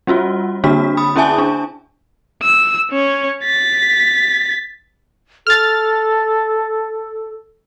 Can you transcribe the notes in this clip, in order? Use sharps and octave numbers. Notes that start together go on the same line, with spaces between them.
G3 C#4 F4 F#4
D3 A#3 D4 F#4 B6
B5 D#6
C#4 E4 G#4 E5 G#5 A5
D4
E6
C#4 C#5
A6 B6
A4 F6 A6